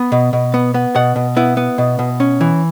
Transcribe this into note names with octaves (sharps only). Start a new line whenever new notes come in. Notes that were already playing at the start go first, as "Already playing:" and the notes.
Already playing: B3
B2
B2
B3
B3
B2 F#5
B2
B3 E4
B3
B2
B2
C#4
E3